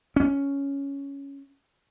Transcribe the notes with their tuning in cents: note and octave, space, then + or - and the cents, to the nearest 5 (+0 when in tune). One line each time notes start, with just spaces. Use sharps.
C#4 +5